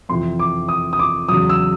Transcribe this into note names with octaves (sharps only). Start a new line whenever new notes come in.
F2 C3 E3 C6
D6
D#6
D#6
D6
E2 C#3 F#3 D#6
E6